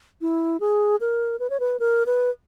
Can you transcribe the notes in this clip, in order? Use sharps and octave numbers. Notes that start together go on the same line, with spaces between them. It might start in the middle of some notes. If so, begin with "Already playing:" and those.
E4
G#4
A#4
B4
C#5
B4
A#4
B4